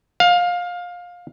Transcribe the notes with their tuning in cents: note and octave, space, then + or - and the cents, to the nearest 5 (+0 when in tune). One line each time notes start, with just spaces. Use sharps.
F5 +20